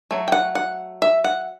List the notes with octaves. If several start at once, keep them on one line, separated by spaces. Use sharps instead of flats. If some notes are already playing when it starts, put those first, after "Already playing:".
F#3 A3
G5
F#5
F#5
E5
F#5